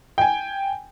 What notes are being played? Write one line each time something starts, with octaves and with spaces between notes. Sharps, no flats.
G5 G#5